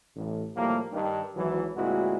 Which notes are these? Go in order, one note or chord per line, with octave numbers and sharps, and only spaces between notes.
A1
D#2 A2 F3 G3 A#3
G2 D#3
G#1 E3 F#3
D2 A#2 G#3 C4 E4 F#4